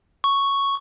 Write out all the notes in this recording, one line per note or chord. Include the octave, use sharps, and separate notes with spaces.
C#6